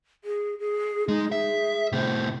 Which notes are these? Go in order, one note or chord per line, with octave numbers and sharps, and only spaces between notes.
G#4
G#4
G#3 D#4
G#4 E5
A2 C3 C5